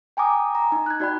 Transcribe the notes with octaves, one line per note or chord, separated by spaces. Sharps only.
G5 G#5 A#5 D6 D#6
A#5
D#4
F#6 G#6
D#4 F#4 D5 G5 B5